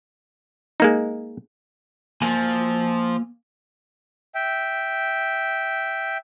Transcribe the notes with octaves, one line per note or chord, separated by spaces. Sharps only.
G#3 A#3 D#4
F3 A#3 G#5
E5 G5